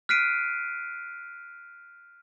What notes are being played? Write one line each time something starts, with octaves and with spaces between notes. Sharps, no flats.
F6 F#6 B6 C7 D7 D#7